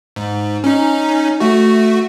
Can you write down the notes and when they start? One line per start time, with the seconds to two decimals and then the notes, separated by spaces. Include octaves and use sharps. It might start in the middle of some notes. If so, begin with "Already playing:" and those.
0.16 G#2
0.64 C#4 D#4
1.40 A3 F#4